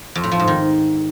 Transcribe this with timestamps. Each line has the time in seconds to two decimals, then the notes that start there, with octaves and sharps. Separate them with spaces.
0.15 F2
0.24 A2
0.32 F3
0.40 G#2
0.48 D#3